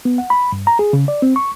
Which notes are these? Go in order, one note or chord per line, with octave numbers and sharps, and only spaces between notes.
B3
F#5
B5
G2
A#5
G#4
C#3
D5
C4
C#6